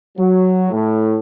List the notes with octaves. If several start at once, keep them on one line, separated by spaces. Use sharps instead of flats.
F#3
A2